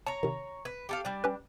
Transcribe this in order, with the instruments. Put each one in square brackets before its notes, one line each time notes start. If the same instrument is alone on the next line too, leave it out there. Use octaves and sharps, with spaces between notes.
[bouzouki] C#5 A#5 [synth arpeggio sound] A5
[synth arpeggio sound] C3 D#3
[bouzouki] B4 [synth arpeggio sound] G#6
[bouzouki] G4 A4 F5
G3 D4
[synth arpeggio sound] C#4 G4 B4